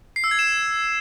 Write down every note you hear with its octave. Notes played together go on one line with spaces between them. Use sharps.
C7
E6
G#6
E7